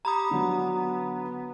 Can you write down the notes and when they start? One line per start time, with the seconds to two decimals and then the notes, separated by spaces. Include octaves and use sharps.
0.05 G4 A#5 B5 D#6
0.31 D3 F#3 B3